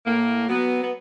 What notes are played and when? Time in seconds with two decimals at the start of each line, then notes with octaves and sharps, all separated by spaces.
0.06 A2 A#3
0.48 F#3 B3
0.82 B3